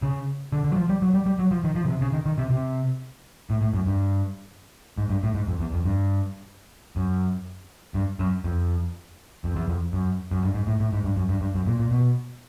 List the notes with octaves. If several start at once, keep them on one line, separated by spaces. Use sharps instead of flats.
C#3
D3
D3
F#3
F3
G3
F#3
G3
G3
F#3
F3
D#3
F3
C#3
C3
C#3
D#3
D#3
C3
C3
A2
A2
F#2
G2
G#2
G2
A2
G#2
F2
E2
F2
G2
F#2
G2
F#2
F2
F2
E2
F2
F#2
F#2
G2
G#2
A2
A2
G#2
G2
F#2
G2
G2
F#2
A#2
A#2
B2